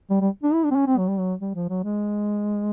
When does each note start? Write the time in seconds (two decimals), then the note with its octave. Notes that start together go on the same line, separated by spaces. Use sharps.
0.10 G3
0.21 G3
0.43 D4
0.53 E4
0.64 D4
0.71 C4
0.76 C#4
0.87 C4
0.98 F#3
1.08 G3
1.19 F#3
1.41 G3
1.55 F3
1.69 F#3
1.84 G#3